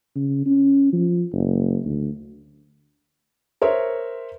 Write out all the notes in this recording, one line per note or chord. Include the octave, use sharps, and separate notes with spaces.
C#3
C#4
F3
F#1
D2
A#4 C5 C#5 E5